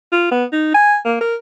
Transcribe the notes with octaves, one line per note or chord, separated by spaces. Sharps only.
F4
B3
D#4
G#5
A#3
A#4